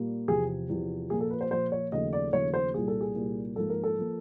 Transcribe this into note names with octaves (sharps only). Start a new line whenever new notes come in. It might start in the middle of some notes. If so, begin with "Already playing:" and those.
Already playing: A#2 G3 A#3
E2 C3 F3 G#4
E2 C3 F3
A#2 F3 A#3 G#4
A4
B4
C5
A#2 F3 A#3 C5
C#5
D#2 C#3 F3 A3 D#5
D5
D#2 C#3 F3 A3 C#5
C5
C2 A#2 G3 A#3 G#4
A4
G#4
C2 A#2 G3 A#3
G#2 F3 A#3 A4
A#4
A4
F3 A#3